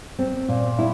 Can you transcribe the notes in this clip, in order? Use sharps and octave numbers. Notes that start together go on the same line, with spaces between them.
C4
A#2
E4